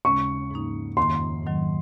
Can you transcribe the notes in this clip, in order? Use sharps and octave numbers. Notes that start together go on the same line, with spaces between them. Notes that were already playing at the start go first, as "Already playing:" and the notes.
D#2 C#3 G#3 C#4 C#6
G#2 F3 A#3 D#4
F2 D#3 A#3 C6
G#2 D#3 F#3